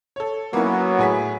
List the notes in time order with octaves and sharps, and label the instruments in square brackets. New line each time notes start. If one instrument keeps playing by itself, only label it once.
[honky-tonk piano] A4 C#5
[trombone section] F#3 B3 [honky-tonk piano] A#3 C#4 E4
[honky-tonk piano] A2 G#4 B6